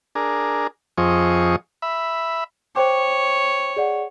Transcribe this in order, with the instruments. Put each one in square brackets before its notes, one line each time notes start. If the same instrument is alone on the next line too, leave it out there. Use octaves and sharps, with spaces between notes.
[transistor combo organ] D4 G#4 A#4
F2 F3 C4 G#4 D#5 C#6
E5 B5
[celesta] C5 G5 D6 [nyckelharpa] C#5
[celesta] G#4 D5 F#5